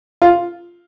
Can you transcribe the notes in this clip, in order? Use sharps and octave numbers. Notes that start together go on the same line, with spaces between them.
F4